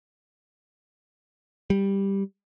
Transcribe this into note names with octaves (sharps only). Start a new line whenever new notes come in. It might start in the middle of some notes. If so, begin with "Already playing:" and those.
G3